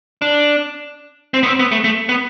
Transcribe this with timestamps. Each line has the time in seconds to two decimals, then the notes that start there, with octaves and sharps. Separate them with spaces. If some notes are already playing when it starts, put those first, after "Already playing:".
0.22 D4
1.34 C4
1.43 B3
1.46 C4
1.59 B3
1.72 A3
1.84 A3
2.09 B3